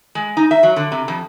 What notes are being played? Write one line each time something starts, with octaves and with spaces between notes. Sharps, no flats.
G#3
D#4
E5
F#3
D3
C3
F2